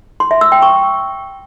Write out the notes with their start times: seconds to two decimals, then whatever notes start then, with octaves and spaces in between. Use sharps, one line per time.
0.20 C6
0.31 E5
0.41 E6
0.52 G5
0.62 C#6